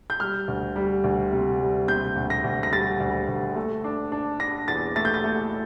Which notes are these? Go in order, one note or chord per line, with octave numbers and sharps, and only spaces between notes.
G6
G3 F6
D2
G3
D2
C3
G3
C3 G6
D2
A#6
D2
A#6
G3 A6
D2
D2
A3
D4
D4
D4 A#6
E2 A6
A3 A6
G6
A6
A3